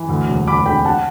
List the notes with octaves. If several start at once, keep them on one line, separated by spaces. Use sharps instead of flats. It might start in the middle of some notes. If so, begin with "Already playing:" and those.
Already playing: E3
D2
E1
E1 B5 D6
D3 G5 B5
F#5 A5